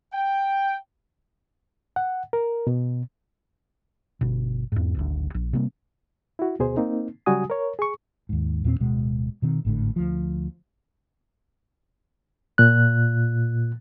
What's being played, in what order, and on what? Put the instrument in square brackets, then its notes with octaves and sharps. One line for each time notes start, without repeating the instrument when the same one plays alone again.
[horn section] G5
[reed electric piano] F#5
A#4
B2
[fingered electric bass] G1 B2
E2 G#2
D1 G#1 D2
A#1
C3 G3 A#3 C4
[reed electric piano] E4 F#4
D2 B2 G#4 C5
A#3 C4 D#4
C#3 F#3 G3 F#4 G#5 D#6
A#4 C#5
G#4 C#6
[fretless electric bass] D#2 G#2
E2 A#2 A#3 C4
D1 B2 G#3
B2 D#3 C4
G#1 A2 D3
D2 F3
[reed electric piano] A#2 F#6